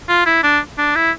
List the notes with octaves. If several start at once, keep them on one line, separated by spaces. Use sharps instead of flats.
F4
E4
D4
D4
E4